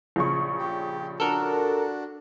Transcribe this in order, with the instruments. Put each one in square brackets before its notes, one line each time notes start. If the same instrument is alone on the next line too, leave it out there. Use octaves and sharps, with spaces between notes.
[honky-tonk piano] A#1 C#3 C#6
[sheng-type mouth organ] G4
[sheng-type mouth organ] D4 F#4 [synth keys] A4 A#4